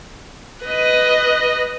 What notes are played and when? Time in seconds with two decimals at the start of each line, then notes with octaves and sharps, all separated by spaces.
0.65 B4 D#5